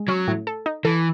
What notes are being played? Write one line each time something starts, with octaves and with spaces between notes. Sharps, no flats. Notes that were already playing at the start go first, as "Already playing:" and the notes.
Already playing: G#3
F#3 C#4
A2
A4
D#4
E3 A4